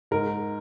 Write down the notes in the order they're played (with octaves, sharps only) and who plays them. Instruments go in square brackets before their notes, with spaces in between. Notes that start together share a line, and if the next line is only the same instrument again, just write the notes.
[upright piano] G#2 A#4